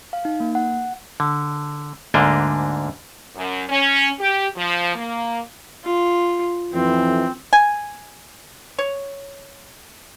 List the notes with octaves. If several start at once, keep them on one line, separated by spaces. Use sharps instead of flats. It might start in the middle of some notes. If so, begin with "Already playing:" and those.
F5
D#4
A#3
F#5
D3
D2 G#2 D3 A#3 D4 D#5
F#2
C#4
G4
F3
A#3
F4
F2 A2 E3 C4
G#5
C#5